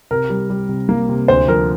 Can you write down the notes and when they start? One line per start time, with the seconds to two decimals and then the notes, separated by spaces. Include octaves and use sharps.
0.11 C3 A#4
0.30 G3
0.50 G3
0.69 C3
0.89 A#3
1.09 C3
1.28 D2 C5
1.48 F3 A#4